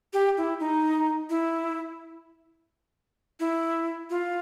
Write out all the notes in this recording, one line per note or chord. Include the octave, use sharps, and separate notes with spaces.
G4
E4
D#4
E4
E4
F4